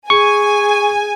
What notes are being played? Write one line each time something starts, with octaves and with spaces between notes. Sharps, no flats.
G#4 G#5 C#6